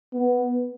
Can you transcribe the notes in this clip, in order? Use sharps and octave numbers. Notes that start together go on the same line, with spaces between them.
B3